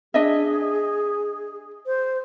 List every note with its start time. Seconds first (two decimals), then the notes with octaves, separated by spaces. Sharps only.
0.14 D4 G#4 D#5 E5
1.86 C5